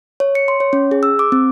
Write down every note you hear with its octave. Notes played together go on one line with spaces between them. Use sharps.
C#5
C#7
C6
C#5
C#4
G#4
E6
D6
C4